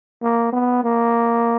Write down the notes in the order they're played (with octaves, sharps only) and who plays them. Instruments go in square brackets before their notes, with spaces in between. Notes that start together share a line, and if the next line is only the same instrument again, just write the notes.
[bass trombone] A#3
B3
A#3